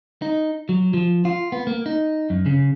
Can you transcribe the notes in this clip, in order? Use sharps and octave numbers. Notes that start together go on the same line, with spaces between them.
D#4
F#3
F3
F4
B3
A#3
D#4
F#2
C#3